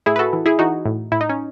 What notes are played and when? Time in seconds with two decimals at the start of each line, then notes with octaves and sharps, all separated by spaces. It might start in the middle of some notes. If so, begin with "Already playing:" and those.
0.06 A2 E4 G#4
0.16 B4
0.19 F#4 A4
0.33 E3
0.46 E4 G#4
0.59 E3 D#4 F#4
0.86 A2
1.12 A2 E4
1.21 D#4
1.29 C#4